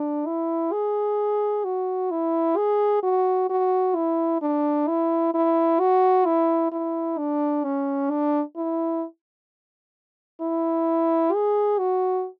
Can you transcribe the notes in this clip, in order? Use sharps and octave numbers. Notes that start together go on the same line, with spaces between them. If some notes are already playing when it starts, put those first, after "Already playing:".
Already playing: D4
E4
G#4
F#4
E4
G#4
F#4
F#4
E4
D4
E4
E4
F#4
E4
E4
D4
C#4
D4
E4
E4
G#4
F#4